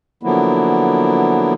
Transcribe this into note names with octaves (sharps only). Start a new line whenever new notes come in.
D3 F3 F#3 A#3 B3 E4